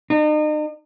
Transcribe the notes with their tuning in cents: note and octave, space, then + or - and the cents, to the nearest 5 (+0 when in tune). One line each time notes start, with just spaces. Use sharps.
D#4 -40